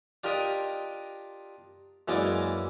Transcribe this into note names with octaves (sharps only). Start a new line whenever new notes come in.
D4 F4 G4 A#4 D#5
F#2 E3 G#3 A#3 C#4 D5